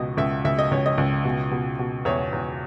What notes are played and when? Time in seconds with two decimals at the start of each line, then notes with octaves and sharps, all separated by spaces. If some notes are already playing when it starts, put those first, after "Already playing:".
Already playing: C#2 B2 D#5
0.17 C#2 E5
0.45 C#2 E5
0.59 D#5
0.71 C#2 C#5
0.86 D#5
0.98 C#2
1.25 B2
1.52 B2
1.79 B2
2.05 E2 C#5
2.33 E2